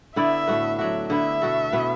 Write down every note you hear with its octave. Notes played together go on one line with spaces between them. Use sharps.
D3 B3 E4 D5 E5
A2 A3 F#4 B4
F#3 D4 F#4 E5
D3 B3 E4 E5
B2 A3 F#4 A4
B2 B3 E4 B4